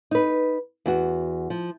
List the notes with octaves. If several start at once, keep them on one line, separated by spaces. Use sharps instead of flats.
D#4 B4
E2 F#4
F3